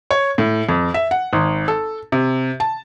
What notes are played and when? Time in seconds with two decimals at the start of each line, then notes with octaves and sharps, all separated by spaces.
0.11 C#5
0.38 A2
0.69 F2
0.94 E5
1.11 F#5
1.33 G#1
1.68 A4
2.12 C3
2.60 A5